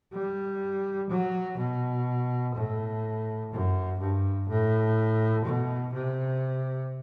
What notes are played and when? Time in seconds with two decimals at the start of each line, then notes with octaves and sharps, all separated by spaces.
0.13 G3
1.10 F#3
1.58 B2
2.55 A2
3.52 F#2
4.00 G2
4.49 A2
5.45 B2
5.94 C3